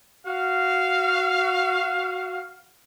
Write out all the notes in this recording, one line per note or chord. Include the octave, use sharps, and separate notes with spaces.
F#4 F5